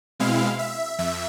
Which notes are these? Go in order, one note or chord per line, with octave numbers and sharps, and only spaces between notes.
B2 G#3 C4 E4 F5
E5
F2 E5